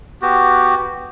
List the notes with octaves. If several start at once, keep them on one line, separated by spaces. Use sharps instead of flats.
B3 F#4 G4